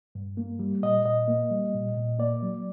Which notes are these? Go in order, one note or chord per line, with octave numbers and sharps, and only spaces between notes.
G2
A#3
G3
A#2 D#5
A#2 D#5
A#3
G3
A#2
A#2
A#3 D5
F#3